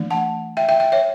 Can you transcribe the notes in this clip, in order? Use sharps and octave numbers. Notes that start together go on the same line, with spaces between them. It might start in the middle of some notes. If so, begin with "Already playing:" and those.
Already playing: E3 A3 D4
F#5 A5
E5 G5
E5 G5
E5 G5
C#5 E5